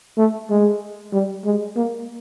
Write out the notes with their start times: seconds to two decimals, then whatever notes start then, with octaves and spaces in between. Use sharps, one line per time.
0.18 A3
0.50 G#3
1.13 G3
1.45 G#3
1.76 A#3